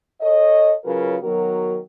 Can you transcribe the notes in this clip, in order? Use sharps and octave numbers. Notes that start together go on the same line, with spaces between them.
A4 C#5 D#5
C#3 F#3 F4 A#4 B4
D#3 F#3 B3 F#4 A#4